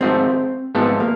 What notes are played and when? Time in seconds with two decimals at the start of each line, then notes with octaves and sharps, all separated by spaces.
0.01 G#1 G#2 F3 A3 C4
0.75 G#1 G#2 F3 A3 B3
1.00 A#3